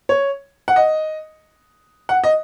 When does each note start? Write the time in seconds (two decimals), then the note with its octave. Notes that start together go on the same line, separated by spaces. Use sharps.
0.09 C#5
0.68 F#5
0.76 D#5
2.09 F#5
2.24 D#5